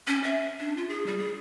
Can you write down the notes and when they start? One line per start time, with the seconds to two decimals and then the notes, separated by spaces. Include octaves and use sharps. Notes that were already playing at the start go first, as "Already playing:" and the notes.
0.07 C#4
0.24 E5
0.60 D4
0.77 F4
0.89 G#4
1.07 G3
1.18 G#4